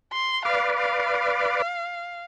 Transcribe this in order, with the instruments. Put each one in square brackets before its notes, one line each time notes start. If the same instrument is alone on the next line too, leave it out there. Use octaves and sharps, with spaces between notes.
[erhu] C6
[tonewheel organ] B4 D5 [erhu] F5
[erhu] F5